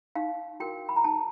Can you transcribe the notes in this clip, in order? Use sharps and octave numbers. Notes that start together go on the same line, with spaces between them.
D#4 F5
F#4 A#4 G5
B5
A#5
D#4 A5